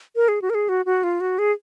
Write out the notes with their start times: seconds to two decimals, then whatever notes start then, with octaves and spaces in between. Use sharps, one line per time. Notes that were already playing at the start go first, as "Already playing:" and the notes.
0.16 A#4
0.28 G#4
0.42 F#4
0.50 A#4
0.55 G#4
0.69 F#4
0.86 F#4
1.04 F4
1.20 F#4
1.39 G#4